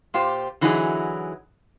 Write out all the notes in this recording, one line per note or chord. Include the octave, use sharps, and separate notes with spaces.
A#2 F4 G4 C5
D3 E3 F#3 D#4 E4 G#4